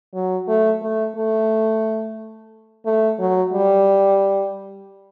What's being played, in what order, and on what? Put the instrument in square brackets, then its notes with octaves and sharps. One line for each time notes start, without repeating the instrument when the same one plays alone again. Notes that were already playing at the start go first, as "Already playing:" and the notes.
[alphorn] F#3
A3
A3
A3
A3
F#3
G3